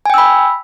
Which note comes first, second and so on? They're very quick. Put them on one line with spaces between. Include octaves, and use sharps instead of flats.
G#5 G5 E6 B5